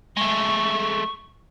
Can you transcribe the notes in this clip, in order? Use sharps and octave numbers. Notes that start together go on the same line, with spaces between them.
G#3 A3 C#6